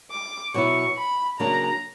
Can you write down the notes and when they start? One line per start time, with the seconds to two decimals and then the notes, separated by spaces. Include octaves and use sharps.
0.11 D6
0.54 B2 F#3 B3 E4 C#6
0.97 B5
1.39 C#3 F#3 A#3 D4 A#5